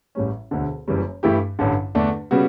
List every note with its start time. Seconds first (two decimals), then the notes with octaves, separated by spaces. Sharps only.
0.15 A1 A2 G3 C#4
0.51 E1 D2 D3
0.87 F#1 F#2 E3 G3 C#4
1.23 G2 E3 A3 E4 G4
1.59 A1 G2 D3
1.95 E2 D3 A3 D4
2.31 C#3 G3 B3 F#4